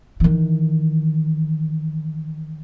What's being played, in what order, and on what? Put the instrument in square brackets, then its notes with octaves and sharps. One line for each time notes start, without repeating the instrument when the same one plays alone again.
[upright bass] D#3 E3